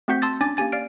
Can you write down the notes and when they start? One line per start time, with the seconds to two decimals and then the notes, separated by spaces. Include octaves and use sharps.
0.08 A3 C4 F#4 F#5 G6 B6
0.22 A5 C6 D#6 E6 A6
0.41 C#4 D4 G#5 D6 A6
0.57 A#3 C#4 G4 G#5 A6
0.72 D5 F5 F6 D7